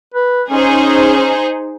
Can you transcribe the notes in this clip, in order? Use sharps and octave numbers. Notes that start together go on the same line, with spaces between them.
B4
C#4 D#4 G#4 C5